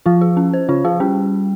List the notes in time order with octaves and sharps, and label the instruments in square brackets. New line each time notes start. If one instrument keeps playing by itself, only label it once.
[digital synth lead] F3 [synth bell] F4
[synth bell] G#4
C#4
C5
[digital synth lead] C#3 [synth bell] F4
[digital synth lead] F3 [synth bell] G#4
[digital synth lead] G3 [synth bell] C#4